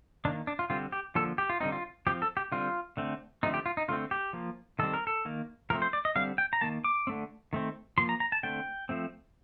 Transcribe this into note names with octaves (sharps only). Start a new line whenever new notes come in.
D#3 A#3 D4
D4
F4
D3 G3 C4 F4
G4
D3 F3 A#3 A4
G4
F4
D3 G3 C4 D#4
F4
F3 C4 G4
A4
G4
D3 G3 C4 F4
D3 A3 C4
D3 F3 A3 C4 D#4
G4
F4
D#4
D3 A3 C4 F4
G4
F3 A#3
D#3 G3 C4 A4
A#4
A4
D#3 A#3
F3 A3 C4 A#4
C5
D5
D#5
D3 G3 C4 F5
G5
A#5
D#3 A#3 A5
D6
D3 A3 C4
D#3 A3 C4
F3 A#3 C6
A#5
A#5
A5
D3 A3 C4 G5
F3 A3 C4